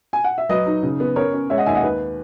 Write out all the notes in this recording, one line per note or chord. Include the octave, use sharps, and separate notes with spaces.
G#5
F#5
E5
F#3 B4 D#5
D#4
C#3
B3
C#4 A#4 C#5
C#4
G#3 C#5 E5
D#5 F#5
D#2 E5 G#5
D#5 F#5
D#3 B4